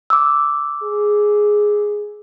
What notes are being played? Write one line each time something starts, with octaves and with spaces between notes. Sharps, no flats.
D6 E6
G#4